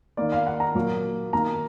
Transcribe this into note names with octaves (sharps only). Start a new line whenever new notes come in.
D#3 A#3 D5
F5
F#5
A#5
A#2 F#3 A#3
D#3 A#3 A#5